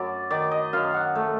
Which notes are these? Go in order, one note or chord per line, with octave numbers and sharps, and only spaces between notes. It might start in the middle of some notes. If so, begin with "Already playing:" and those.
Already playing: F#2 F#3 D5
D#3 D5
D#5
F#2 F5
F#5
A3